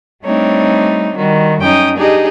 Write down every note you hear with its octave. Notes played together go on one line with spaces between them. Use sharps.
G3 A3 C4 D4 D#4 C#5
D#3 G3 F#4
F#2 C#4 D#4 G5 D#6
D4 D#4 G4 G#4 D#5